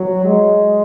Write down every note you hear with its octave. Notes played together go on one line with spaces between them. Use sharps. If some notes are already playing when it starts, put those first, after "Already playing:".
Already playing: F#3
G#3